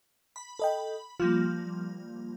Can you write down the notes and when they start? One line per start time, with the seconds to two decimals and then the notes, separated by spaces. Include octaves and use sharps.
0.36 B5
0.59 A4 D#5 G5
1.20 F3 G3 A#3 F4